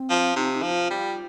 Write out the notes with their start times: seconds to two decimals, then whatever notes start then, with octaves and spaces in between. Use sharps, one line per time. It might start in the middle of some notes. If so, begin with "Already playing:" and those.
Already playing: C4
0.10 F3
0.36 C3 D#4
0.54 D#4
0.62 F3
0.72 F4
0.90 G3